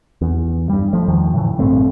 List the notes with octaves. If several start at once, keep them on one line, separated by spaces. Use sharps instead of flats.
E2
G2 G3
F3 A3
E2 D#3 F3
A2 C#3 E3
A#1 G2 A3 C4